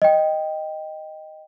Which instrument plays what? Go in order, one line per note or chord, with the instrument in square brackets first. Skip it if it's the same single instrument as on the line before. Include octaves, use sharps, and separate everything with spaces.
[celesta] D#5 G5